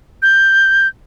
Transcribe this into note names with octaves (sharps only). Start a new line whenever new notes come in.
G6